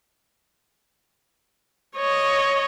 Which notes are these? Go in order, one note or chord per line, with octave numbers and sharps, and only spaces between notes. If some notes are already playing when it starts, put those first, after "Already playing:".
C#5 D#5